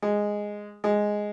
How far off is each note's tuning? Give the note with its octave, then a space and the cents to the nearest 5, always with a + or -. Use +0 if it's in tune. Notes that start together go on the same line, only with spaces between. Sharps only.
G#3 -5
G#3 +0